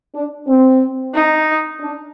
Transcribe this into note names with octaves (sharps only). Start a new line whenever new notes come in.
D4
C4
D#4
D4